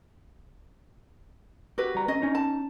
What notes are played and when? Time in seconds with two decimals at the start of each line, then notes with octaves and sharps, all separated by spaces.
1.78 F#4 G4 B4
1.95 G3 A#5
2.08 C#4 D#5
2.22 C#4 D#4
2.35 A5